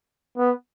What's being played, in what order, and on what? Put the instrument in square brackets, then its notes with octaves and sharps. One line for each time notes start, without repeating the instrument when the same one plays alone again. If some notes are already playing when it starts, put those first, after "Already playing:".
[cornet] B3